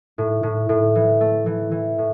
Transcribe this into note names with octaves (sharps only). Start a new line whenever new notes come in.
A2
A2
A2
E3
A3
E3
E3
A2